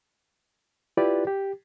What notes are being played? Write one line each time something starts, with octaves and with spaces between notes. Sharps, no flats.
E4 F4 G4 B4 D5
G4